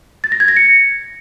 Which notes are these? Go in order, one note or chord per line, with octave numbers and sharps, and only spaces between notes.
A6
A#6
G#6
A#6
C#7